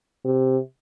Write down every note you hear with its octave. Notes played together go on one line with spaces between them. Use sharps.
C3